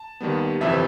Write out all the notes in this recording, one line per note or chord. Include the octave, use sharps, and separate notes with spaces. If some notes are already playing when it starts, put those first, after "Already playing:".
Already playing: A5
D#2 D#3 G3 B3
G1 F2 C3 E3 E5